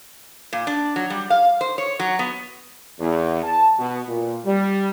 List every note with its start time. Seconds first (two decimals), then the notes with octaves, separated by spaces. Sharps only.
0.53 A#2
0.67 D4
0.96 F#3
1.10 G3
1.30 F5
1.61 C5
1.78 C#5
2.00 F#3
2.19 B3
2.99 E2
3.43 A5
3.79 B2
4.08 A#2
4.45 G3